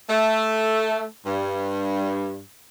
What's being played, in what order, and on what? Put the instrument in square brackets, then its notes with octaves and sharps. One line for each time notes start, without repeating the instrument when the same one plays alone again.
[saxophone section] A3
G2